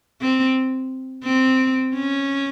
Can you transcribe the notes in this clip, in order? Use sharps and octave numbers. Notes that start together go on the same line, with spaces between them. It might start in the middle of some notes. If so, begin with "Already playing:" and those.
C4
C4
C#4